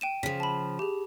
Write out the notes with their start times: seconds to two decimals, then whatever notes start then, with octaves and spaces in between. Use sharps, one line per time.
0.01 G5 D#7 E7
0.23 C#3 F3 B6
0.40 A5 B5
0.79 G4 G#4